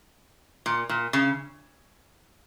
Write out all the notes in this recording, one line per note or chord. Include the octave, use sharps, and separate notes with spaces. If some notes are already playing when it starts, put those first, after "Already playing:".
A#2
A#2
C#3